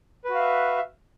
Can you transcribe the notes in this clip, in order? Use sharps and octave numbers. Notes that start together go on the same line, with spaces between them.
F#4 B4 E5 F5